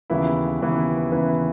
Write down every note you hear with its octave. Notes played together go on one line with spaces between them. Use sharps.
D#2 C#3 E3 B3 E4
D#2 C#3 E3 B3 E4
D#2 C#3 E3 B3 E4